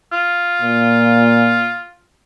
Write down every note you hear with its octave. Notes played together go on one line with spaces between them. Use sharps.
F4
A#2